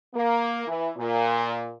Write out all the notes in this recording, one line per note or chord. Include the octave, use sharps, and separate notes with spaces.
A#3
E3
A#2